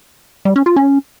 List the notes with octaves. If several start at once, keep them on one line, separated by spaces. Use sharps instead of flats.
G3
C#4
F4
C#4